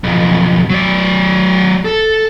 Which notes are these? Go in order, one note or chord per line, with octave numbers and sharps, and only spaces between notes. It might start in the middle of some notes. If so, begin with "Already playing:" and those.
B1 F2
F#3 D5
A4